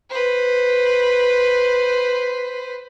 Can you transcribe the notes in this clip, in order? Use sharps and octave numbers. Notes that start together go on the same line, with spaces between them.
B4 C5